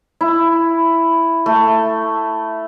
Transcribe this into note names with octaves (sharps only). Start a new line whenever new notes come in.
E4
A3